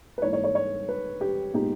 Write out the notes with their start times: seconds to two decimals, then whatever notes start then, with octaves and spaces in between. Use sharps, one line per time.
0.18 B4
0.22 G#2 E3 A#3 D#4 C#5
0.33 C#5
0.44 C#5
0.55 C#5
0.89 B4
1.21 G4
1.54 A#2 G#3 B3 D#4 G4